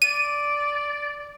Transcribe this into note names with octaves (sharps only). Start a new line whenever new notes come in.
D5 D#7